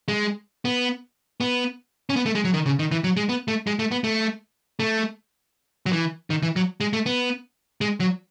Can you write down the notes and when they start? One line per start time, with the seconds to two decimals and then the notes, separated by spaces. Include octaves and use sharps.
0.08 G#3
0.65 B3
1.41 B3
2.10 C#4
2.16 B3
2.26 A3
2.35 G#3
2.45 F#3
2.54 D#3
2.66 C#3
2.79 D#3
2.91 E3
3.04 F#3
3.17 G#3
3.29 B3
3.48 A3
3.67 G#3
3.79 A3
3.91 B3
4.04 A3
4.80 A3
5.86 F#3
5.93 E3
6.30 D#3
6.42 E3
6.56 F#3
6.81 G#3
6.93 A3
7.06 B3
7.81 G#3
8.00 F#3